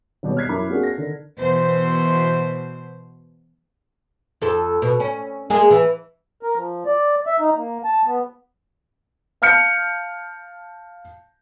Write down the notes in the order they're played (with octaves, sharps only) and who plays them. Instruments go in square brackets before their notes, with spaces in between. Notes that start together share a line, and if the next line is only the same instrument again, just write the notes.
[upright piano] G#1 B2 G3 G4 C#5
F6 F#6 G#6 B6 C7
F#2 E4 B5 D6
A#3 C4 D4 F#4 G#4
A#6
D3 D#3
[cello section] B2 E3 C5
[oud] F2 A4
B2
C#4
G#3 A#3 G#4
E3
[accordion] A#4
F3
D5
E5
D#4
A#3
A5
B3
[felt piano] F5 A5 F6 G6 C#7